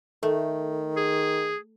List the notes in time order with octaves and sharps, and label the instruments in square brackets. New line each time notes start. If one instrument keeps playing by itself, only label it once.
[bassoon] D#3 [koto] A3
[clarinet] G#4